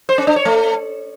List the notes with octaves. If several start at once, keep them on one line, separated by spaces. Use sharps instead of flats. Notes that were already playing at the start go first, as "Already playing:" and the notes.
C5
C#4
D4
C#5
A3